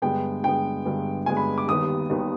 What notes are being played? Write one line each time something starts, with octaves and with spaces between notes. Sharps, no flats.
G2 D3 G#3 B3 G5
G2 D3 G#3 B3 G5
G2 D3 G#3 B3
G2 D3 G#3 B3 G#5
B5
D6
D#2 D#3 G3 B3 D#6
D#2 D#3 G3 B3